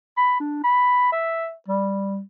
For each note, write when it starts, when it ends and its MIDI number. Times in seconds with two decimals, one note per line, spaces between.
0.17 0.36 83
0.40 0.63 62
0.63 1.11 83
1.12 1.52 76
1.68 2.20 55